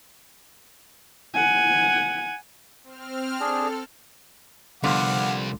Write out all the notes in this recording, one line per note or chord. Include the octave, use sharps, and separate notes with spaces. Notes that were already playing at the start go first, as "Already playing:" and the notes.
F#5 G#5
C4 F6
D4 G#4 A4
C2 D3 F3 B3 F5 F#5 D6